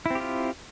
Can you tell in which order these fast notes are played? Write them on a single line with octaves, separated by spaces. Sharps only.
E4 C4 G4 F4